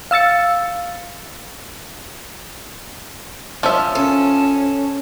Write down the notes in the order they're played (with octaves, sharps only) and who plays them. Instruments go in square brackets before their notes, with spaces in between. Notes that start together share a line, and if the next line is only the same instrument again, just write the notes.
[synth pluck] F5 E6 A6 C#7
[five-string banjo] F3 E5 [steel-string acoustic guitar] C#4
[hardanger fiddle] C#4 [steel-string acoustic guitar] A4